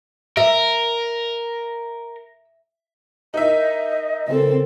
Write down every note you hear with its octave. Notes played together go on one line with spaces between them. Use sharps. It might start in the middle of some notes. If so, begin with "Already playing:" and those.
A#4 E5
D#4 E4 A#4 D#5 E5
C#3 C4 A4 A#4 C5